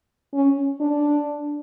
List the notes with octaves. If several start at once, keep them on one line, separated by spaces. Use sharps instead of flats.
C#4
D4